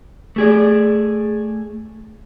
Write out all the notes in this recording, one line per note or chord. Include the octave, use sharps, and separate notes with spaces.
A3 G#4 D5